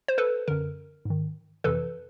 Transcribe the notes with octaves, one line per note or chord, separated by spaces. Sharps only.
C5
A4 B4
F#2 D3 A#4
G#2 D#3
F2 C3 E3 A4 B4